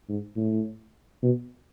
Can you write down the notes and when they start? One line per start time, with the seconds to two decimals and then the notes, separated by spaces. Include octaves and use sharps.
0.09 G#2
0.37 A2
1.22 B2